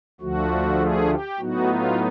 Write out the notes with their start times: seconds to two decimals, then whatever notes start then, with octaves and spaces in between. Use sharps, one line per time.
0.21 D2 D3 F3 A3 F#4
0.80 G#4
1.10 G4
1.39 A2 F#3 B3 D#4 F#4
1.68 F4